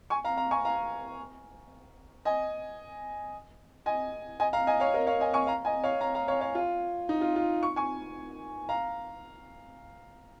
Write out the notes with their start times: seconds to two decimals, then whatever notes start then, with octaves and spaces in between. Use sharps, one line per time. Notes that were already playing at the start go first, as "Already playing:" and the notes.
0.10 G#5 C#6
0.24 F5 A#5
0.37 F5 A#5
0.51 G#5 C#6
0.65 F5 A#5
2.25 D#5 G#5
3.86 D#5 G#5
4.40 D#5 G#5
4.53 F5 A#5
4.67 D#5 G#5
4.80 C#5 F5
4.94 A#4 D#5
5.07 C#5 F5
5.20 D#5 G#5
5.33 G#5 C#6
5.47 F5 A#5
5.65 D#5 G#5
5.84 C#5 F5
6.01 F5 A#5
6.15 F5 A#5
6.28 C#5 F5
6.41 C#5 F5
6.55 F4
7.09 D#4
7.21 F4
7.36 F4
7.63 C#6
7.76 G#5 C#6
8.69 F5 A#5